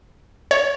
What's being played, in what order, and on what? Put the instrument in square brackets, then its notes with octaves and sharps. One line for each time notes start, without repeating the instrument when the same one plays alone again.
[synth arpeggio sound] C#5